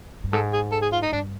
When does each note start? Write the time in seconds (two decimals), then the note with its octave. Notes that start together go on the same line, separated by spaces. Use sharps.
0.24 G2
0.33 G#2 A4
0.53 G#4
0.72 A4
0.82 G#4
0.92 F4
1.03 D#4
1.12 G2 D4